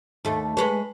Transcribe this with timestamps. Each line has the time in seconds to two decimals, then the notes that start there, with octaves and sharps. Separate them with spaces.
0.25 D#2 A3
0.57 G#3 B4 C#5